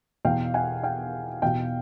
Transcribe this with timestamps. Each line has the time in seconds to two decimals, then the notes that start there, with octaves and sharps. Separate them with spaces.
0.25 E2 B2 F5 G5
0.54 F#5 G#5
0.83 F5 G5
1.42 E2 B2 F5 G5